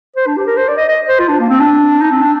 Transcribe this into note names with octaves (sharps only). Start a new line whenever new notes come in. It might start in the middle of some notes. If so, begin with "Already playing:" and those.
C5
D4
G4
A#4
C5
D5
D#5
D#5
C5
F4
D4
A#3
C4
D4
D#4
C4
D4